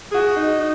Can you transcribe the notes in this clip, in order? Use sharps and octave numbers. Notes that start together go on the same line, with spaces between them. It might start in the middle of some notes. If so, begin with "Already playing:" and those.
F#4 G#4
D#4
D#4